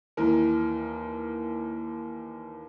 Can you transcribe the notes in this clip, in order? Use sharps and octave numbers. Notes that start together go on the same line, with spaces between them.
D#2 E3 A#4